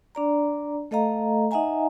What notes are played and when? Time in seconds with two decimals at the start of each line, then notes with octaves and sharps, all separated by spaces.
0.15 D4 D5 A#5
0.91 A3 A4 D#5 F5 A#5
1.51 D#4 D#5 E5 F#5 G#5 A#5